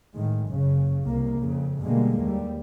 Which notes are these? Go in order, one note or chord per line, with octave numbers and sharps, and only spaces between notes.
A2 D#3 G#3
F#1 C#3
C2 A#3
F2 C#3
B2 D3 G3 G#3 A#3
D#2 G3